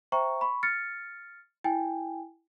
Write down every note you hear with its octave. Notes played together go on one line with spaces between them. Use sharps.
C5 E5 G5 A#5 C#6
B5 C#6
F6 A6 C#7
E4 G5 G#5